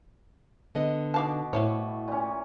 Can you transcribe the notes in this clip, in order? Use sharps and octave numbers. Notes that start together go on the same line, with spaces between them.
D3 B3 D#5
B2 D#4 F5 A5 D6
A2 E4 C5 C#5
A#2 C#4